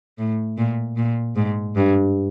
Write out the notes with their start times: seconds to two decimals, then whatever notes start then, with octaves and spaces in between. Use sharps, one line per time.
0.18 A2
0.58 A#2
0.97 A#2
1.36 G#2
1.76 G2